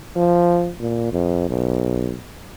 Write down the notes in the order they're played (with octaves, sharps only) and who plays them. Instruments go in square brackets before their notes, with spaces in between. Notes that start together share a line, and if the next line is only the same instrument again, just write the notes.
[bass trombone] F3
A#2
F2
B1